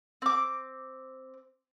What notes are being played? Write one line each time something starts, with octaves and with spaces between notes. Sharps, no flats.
C4 D6